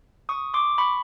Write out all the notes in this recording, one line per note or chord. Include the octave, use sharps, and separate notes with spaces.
C#6 D#6
C6 D6
B5 C#6